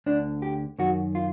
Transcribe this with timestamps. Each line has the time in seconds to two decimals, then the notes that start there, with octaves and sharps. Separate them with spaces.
0.06 D2 D3 D4
0.42 G4
0.79 F#2 D#3 F#4
1.15 F4